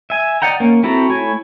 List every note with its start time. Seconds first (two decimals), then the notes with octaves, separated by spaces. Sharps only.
0.10 E5 G#5
0.42 D5 D#5 F#5 G5 A#5
0.60 A#3 C#4
0.83 C4 E4 F#4 A4 A#5
1.10 A3 E4 C#5 G#5